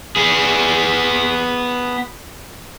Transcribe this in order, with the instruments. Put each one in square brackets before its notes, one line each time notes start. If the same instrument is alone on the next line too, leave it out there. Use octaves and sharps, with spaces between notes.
[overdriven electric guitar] B3 G#4